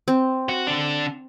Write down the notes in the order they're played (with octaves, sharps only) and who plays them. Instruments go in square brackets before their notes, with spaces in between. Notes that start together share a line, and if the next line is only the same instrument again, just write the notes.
[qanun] C4
[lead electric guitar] F#4
D3 D4